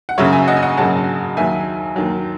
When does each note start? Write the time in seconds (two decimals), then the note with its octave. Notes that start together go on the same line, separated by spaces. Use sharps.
0.09 F#5
0.18 F#2 C#3 F#3 C#5 E5
0.33 E5 G#5
0.48 D#5 F#5
0.57 G#5
0.62 D#5 F#5
0.77 F#2 C#3 F#3 F#5 A5
1.37 D#2 D#3 F#3 E5 G#5
1.96 D#2 D#3 F#3